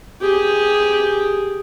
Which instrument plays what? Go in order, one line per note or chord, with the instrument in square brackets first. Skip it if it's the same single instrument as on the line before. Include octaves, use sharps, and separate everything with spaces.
[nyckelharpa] G4 G#4